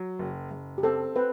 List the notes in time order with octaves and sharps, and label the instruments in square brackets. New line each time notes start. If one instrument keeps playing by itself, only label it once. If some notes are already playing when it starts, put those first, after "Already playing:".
Already playing: [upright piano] F#3
F#1
F#1
[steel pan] G4
[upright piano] C4 [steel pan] A4
[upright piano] C4 [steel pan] B4